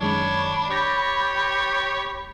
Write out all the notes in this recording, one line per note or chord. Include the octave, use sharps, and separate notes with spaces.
F#2 D#3 G#3 D4 C#5 B5
G4 C#5 D6 A6 A#6